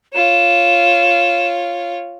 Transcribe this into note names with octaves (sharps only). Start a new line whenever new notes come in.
F4 C#5 E7